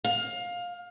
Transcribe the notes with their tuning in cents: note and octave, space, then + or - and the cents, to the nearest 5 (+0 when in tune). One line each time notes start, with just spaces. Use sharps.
F5 +20